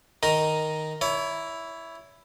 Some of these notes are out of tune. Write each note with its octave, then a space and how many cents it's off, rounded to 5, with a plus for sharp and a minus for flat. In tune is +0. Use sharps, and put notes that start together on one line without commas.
D#3 +0 D#4 +0 A#4 +0
E4 +0 C#5 +30